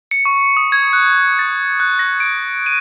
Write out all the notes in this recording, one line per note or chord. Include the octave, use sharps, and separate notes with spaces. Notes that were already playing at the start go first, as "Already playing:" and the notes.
C#7
C#6
D#6
G#6
F#6
A6
F#6
A#6
D7
D#7